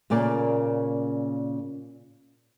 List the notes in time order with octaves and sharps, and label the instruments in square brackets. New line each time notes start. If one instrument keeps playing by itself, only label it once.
[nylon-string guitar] A#2 C#3 A#3 D5